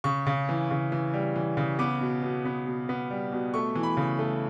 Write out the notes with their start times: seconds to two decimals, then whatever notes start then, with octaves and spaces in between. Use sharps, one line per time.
0.04 C#3 C#6
0.27 C#3
0.49 E3
0.71 C#3
0.92 E3
1.14 G3
1.36 E3
1.57 C#3
1.79 B3 D6
2.01 B2
2.22 B2
2.45 B3
2.67 B2
2.89 B3
3.10 G3
3.32 B2
3.54 A3 C#6
3.75 E3
3.83 B5
3.97 C#3
4.19 A3